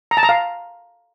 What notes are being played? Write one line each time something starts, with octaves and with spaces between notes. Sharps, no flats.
A#5
A5
A#5
F5